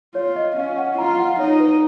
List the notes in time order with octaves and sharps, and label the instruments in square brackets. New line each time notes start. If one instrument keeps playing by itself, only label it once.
[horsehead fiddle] F4 [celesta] C#5
[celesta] D#5
[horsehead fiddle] C#4 [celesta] F5
[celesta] F#5
[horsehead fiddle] F4 [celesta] A#5
[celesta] F#5
[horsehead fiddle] D#4 [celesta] C#5
[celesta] B4